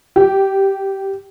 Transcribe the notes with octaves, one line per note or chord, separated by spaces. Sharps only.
G4